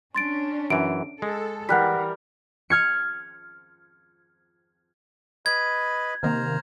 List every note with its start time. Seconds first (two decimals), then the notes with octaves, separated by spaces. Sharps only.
0.15 C#4 D4 C6 A6 D7
0.70 F#2 E3 D7
1.22 G#3 A4
1.69 E3 G3 A#4 F#5 F#6 B6
2.70 F6 G#6 C#7
5.46 B4 D#5 B5 G#6
6.23 C3 D#3 A#3 C5 A#5 F6